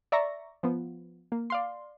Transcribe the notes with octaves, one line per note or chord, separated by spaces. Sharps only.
D5 E5 A#5 C#6 A#6
F3 B3
A#3
D5 F5 C6